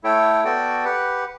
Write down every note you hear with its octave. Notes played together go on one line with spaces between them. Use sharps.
A3 E4 A4 C#5 G5
B3 F#4 A4 D5 G5
G4 B4 F#5